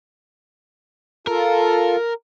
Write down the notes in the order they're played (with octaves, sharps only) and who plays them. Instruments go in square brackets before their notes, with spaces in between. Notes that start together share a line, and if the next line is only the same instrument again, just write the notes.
[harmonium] F4 A4 [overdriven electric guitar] A#4